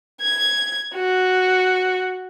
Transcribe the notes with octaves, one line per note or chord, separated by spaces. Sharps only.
G#6
F#4